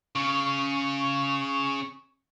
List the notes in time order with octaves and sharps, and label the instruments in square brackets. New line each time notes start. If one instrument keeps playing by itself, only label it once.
[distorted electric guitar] C#3 [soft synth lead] C#6